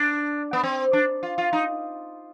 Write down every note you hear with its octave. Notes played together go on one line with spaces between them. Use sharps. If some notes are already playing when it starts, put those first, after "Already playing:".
Already playing: D4
B3
C4
D4
F4
F4
D#4